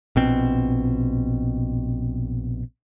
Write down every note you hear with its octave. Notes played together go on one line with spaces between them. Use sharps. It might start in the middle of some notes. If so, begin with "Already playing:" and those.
A#1 B2 C4